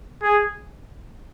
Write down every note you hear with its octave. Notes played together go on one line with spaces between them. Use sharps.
G#4